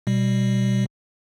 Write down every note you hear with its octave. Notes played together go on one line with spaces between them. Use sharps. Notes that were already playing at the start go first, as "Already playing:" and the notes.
B2 G3